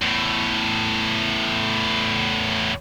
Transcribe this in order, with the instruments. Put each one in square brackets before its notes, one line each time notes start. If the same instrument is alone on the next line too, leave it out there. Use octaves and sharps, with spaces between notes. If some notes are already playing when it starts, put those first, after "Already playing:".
[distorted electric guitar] E2 A2